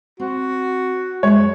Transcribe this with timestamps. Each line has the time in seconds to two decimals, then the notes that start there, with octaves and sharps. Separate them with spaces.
0.20 C4 F#4
1.23 F#2 G3 G#3 C#5